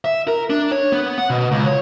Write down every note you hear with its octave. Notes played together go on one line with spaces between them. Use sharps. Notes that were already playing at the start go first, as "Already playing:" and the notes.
E5
A#4
D4
C#5
B3
F#5
B2
C#2
C#5